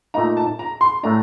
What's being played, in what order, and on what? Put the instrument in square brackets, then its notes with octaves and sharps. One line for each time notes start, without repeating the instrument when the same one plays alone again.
[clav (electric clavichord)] A#2 A3 D#4 [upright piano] A#5
[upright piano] A5
A#5
C6
[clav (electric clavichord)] A2 A3 D4 [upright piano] A#5